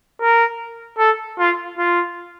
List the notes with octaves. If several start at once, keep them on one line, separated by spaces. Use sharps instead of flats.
A#4
A4
F4
F4